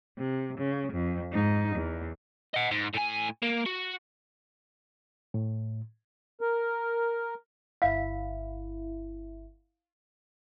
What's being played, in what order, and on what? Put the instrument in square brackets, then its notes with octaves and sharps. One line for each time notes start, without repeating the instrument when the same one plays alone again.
[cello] C3
C#3
F2
G#2 D#4
E2
[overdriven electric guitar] D#5 F#5
G#2
A2 G#5
A#3
F#4
[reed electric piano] A2
[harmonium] A#4
[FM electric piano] G1 E4 [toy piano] F5